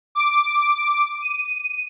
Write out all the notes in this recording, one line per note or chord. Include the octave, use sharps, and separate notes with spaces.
D6
D#7